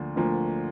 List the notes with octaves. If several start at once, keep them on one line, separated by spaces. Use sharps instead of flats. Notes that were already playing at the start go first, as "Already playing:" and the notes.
Already playing: D2 D3 F3 A#3
D2 D3 F3 A#3